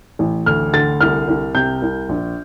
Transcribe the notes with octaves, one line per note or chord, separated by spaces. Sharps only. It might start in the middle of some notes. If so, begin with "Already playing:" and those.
A1
D2 F6
D3 A6
C2 F6
C2
C3 G6
C2
A#1